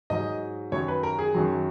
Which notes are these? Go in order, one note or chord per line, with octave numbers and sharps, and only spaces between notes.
G#2 F#3 D#5
F#2 D#3 F#3 C#5
B4
A#4
G#4
F#2 D#3 F#3